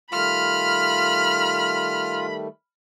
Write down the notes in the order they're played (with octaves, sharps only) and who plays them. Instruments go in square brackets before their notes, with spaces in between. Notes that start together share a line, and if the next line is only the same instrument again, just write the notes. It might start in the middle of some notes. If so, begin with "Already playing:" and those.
[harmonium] D#3 G3 A3 [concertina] F4 [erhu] B5 [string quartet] F6